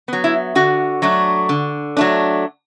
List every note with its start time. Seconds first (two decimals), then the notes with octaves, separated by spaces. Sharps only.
0.08 F#3 B3
0.24 E4
0.55 D3 F#4
1.02 F#3 A3 D4
1.49 D3
1.97 F#3 A3 D4